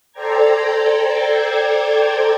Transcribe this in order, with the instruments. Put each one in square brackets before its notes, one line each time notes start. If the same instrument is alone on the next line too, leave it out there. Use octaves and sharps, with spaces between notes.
[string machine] A4 C5 D5 G5 A#5 G#6